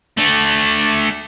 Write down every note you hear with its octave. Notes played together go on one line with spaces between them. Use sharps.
A3 D4